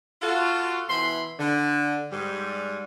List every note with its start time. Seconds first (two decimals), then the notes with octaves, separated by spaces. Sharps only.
0.22 F4 F#4 A4
0.89 B2 E3 B5 C6
1.38 D3
2.11 G#2 G3